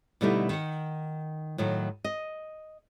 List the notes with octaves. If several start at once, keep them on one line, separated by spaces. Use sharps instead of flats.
B2 D3 G3 A3 D#4 E4
D#3 F#5
A2 D#3 F#3
D#5